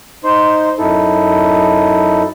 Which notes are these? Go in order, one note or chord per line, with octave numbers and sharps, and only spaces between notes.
D#4 C5 C6
F#2 D#4 E4 A4